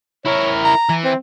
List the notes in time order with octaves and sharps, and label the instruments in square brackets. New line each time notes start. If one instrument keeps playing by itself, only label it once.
[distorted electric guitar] E4 A#4 [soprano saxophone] C#5
[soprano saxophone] A#5
[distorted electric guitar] E3
[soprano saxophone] C4